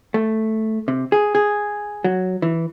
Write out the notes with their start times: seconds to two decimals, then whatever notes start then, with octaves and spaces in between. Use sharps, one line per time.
0.14 A3
0.88 C3
1.12 G#4
1.35 G#4
2.04 F#3
2.42 E3